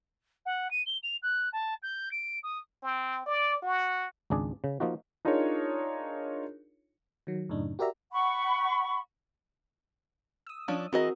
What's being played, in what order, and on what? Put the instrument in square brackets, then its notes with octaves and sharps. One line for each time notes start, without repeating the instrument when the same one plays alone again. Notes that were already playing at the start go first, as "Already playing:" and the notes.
[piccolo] F#5
D#7
G7
F7
F#6
A5
G6
D7
D#6
[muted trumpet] C4
D5
F#4
[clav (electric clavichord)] G#1 C#2 D4 G#4 D5
C#3
F3 A#3 D#4 F4 F#4
[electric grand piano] D4 D#4 F4 G#4 A#4 C#5
[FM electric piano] D#3 F#3
F#2 A2 C#3 D4 D#4
F#4 G4 A#4 D5 E5 A#5
[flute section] F#5 B5 C#6
[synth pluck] D#6 E6
[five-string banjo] F3 C#4 D4
[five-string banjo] E3 G#4 D#5 [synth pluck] C4 F#4 A#4